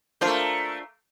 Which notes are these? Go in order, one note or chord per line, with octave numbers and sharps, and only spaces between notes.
A3 A#3 D4 F4 C5